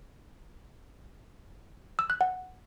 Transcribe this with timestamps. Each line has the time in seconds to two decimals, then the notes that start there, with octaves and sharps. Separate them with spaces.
1.99 E6
2.10 F#6
2.21 F#5